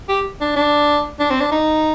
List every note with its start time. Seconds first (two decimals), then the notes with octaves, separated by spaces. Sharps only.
0.09 G4
0.41 D4
0.56 D4
1.20 D4
1.30 C4
1.40 D4
1.51 D#4